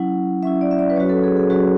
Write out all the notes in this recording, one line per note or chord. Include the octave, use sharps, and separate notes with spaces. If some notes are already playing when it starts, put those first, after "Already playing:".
Already playing: F#3 C#4 E4 F#5
F#3 C#4 E4 E5
D5
E5
D5
B4
F#3 C#4 F#4 C#5
A4
G#4
G#4
F#3 C#4 F#4